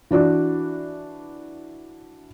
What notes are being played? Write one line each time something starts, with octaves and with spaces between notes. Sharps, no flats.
E3 D4 F#4 D5